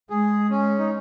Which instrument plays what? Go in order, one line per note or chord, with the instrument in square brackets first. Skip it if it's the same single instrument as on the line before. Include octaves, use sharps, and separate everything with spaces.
[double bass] G#3 [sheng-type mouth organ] G#4
[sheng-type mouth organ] C#4
D#4